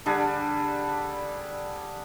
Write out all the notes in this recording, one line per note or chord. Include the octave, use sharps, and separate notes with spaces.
D3 G3 D4 G#4